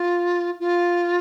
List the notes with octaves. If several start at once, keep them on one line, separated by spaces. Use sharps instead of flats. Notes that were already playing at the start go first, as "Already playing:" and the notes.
Already playing: F4
F4